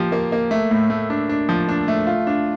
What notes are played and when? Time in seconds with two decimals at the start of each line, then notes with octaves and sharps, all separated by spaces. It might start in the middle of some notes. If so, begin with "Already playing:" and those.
Already playing: F3 A#3 G4
0.12 A#3
0.32 A#3
0.51 A3
0.71 A2
0.90 A3
1.10 D4
1.29 D4
1.49 F3
1.69 D4
1.88 A3
2.07 F4
2.27 D4